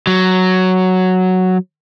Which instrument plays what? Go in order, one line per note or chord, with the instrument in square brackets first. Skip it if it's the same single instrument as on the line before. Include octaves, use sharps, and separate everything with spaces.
[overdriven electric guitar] F#3